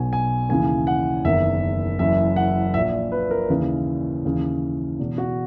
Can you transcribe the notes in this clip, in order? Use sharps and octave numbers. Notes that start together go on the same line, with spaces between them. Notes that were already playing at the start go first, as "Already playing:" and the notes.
Already playing: B1 B2 G#5
G#5
D#2 C#3 E3 G#5
F#5
F#1 E2 D#3 E5
F#1 F#2 E3 E5
F#5
A#1 A#2 E5
B4
A#4
D#2 C#3 E3
D#2 C#3 E3
E1 E2 B2
F#4